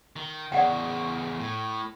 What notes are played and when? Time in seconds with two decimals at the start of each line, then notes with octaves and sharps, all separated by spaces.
0.16 D#3
0.52 E2 C#3 D5 F#5 G5
1.40 A2